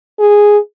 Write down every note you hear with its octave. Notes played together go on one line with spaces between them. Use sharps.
G#4